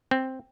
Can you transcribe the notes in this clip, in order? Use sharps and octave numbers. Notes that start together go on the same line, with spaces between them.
C4